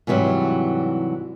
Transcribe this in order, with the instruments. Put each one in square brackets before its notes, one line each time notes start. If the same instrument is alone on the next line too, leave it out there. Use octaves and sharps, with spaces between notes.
[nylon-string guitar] G#2 C3 E3 F#3 G3